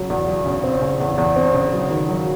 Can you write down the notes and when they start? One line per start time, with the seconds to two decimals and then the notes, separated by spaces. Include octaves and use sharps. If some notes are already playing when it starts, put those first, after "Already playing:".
Already playing: C#3 F#3
0.10 E2
0.27 F#3
0.46 C#3
0.64 C4
0.82 C#3
1.00 E2
1.18 E2
1.36 C4
1.54 C#3
1.73 F#3
1.91 D#3
2.09 F#3